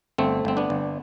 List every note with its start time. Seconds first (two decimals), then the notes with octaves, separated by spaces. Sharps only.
0.18 G1 A3 C4
0.45 G1 C4
0.57 B3 D4
0.70 G1